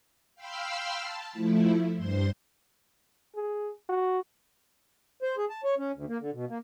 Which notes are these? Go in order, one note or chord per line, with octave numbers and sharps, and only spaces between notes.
F5 G5 B5 C6 E6 F6
A5
F3 A3 E4
G2 C5 C6
G#4
F#4
C5
G#4
A5
C#5
C#4
D2
A#3
D3
B2
A#3